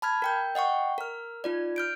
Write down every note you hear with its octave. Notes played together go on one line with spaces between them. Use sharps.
A5 B5 F6 G#6
A#4 G5 G6
D#5 F#5 G5 C#6
A#4 F6
D#4 F4 D5
F6 G6 D7